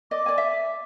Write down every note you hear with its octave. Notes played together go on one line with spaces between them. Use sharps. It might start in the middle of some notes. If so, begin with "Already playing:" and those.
D5 D#5 D6
D5 G#5
E5